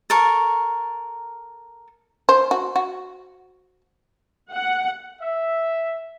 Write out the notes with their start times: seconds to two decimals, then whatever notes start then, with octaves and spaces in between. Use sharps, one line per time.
0.10 A4 A#4 C#6
2.29 C5
2.51 F#4
2.76 F#4
4.51 F#5
5.21 E5